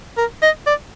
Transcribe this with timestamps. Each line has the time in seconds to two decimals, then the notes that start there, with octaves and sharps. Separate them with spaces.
0.17 A#4
0.42 D#5
0.66 D5